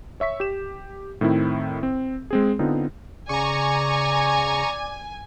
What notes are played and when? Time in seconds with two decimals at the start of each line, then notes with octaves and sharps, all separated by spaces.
0.20 C#5 E5 C#6 B6
0.40 G4 E7
1.21 A2 D#3 C4 E4
1.83 C4
2.31 G#3 C4 G#4
2.59 D3 B3 C4 D#4 F4
3.29 C#3 D5 G#5 A#5 C#6